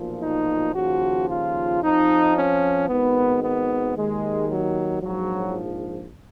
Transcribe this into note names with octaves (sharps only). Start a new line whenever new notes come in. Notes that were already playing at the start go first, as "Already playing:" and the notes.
Already playing: B1 A#2 F3
D#4
D#2 C#3 F3 F#4
F4
F2 F3 D#4
C#4
G#1 G#2 D#3 B3
B3
D#2 D#3 G#3
F#3
A#1 G#2 F3 F#3